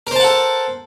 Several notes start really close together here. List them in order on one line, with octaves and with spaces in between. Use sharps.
A#4 C5 A5 F#5 A4